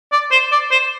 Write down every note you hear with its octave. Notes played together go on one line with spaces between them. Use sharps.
D5
C5
D5
C5